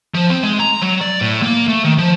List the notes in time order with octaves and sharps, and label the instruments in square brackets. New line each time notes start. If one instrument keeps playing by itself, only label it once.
[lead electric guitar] F3
C4
G#3
A#5
F#3
D5
A2
A#3
A3
D#3
F3